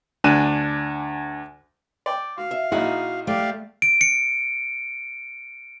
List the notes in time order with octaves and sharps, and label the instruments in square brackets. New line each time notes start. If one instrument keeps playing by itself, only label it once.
[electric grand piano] D2 D4 G#5 F#6 D#7 E7
[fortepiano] D5 G5
[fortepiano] F#4 [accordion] F5
[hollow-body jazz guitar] E5
[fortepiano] A#1 D#4 G#4 [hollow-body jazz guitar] E4 F#5 [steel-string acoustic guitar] F#4
[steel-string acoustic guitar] A3 [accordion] G4 D5 F5
[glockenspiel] D7
C#7